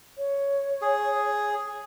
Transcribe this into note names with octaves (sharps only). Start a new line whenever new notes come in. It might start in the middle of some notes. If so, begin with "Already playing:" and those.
C#5
G#4